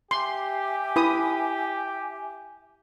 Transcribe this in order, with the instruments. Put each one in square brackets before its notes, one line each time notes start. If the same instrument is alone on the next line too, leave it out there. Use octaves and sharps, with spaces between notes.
[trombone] G4 [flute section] E5 G#5 D6 [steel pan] C6
[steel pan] E4 B4 D#6